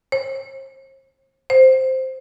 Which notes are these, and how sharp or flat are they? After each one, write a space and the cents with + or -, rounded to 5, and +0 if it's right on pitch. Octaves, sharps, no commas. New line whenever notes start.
C5 +40
C5 +0